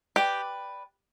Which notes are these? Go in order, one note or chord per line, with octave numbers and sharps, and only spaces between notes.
G4 B4 D5 G5 D6